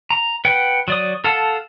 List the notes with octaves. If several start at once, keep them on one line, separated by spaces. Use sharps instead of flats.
A#5
B4 F#5 G5
F#3 D5 D#6
A4 F5 F#5 A5